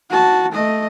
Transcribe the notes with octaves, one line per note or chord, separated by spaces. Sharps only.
F#4 A5
A3 D#5